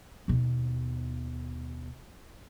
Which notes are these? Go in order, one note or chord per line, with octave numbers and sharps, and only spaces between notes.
D#2 B2